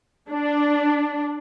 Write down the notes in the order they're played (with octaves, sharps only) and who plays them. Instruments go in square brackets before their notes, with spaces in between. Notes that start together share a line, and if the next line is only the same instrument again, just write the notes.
[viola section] D4